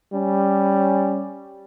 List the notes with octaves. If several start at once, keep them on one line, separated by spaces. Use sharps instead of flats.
G3 C#4